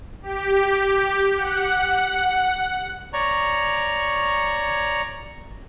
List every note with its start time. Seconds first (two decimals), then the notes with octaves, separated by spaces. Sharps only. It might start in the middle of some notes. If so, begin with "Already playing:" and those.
0.22 G4
1.36 F#5
3.13 C#5 D5 A#5 C#6